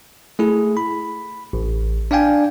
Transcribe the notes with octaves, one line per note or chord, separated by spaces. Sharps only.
A3 E4 G#4
B5
A1
D4 D5 F5 G5 G#5